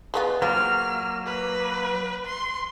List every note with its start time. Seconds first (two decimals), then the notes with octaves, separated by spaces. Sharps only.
0.14 G#3 B3 F4
0.42 F#3 A#3 C4 F4 F6
1.26 B4
2.25 C6